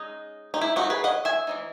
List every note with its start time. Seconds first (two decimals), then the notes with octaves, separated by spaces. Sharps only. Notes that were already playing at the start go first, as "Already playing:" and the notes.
Already playing: G#3 C#4 D#4
0.54 D#4
0.61 E4
0.76 D#4 F#4
0.90 G#4 B4
1.04 D#5 F#5
1.25 E5 G#5
1.47 E3 B3 D#4